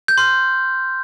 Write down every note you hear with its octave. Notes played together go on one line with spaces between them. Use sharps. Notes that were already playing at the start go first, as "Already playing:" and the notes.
G6
C6 F6